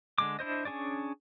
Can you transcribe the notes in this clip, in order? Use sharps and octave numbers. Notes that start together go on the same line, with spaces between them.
D3 G#3 D6
D4 E4 C5 D#5
C#4 D4 G#4 C#5 D5